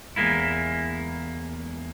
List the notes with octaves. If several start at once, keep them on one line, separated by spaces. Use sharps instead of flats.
E2 G#3 A#3 E4